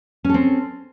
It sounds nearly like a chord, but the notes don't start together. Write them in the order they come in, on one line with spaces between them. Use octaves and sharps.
C#4 A4 C4